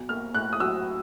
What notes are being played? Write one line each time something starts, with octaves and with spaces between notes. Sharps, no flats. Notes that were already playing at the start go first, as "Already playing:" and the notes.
Already playing: B1
A#3 F6
A2 F#6
D#6
F#3 E6